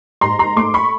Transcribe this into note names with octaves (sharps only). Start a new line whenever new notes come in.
G#2 A#5 C6
A#5 C6
A3 C6 D6
B5 C#6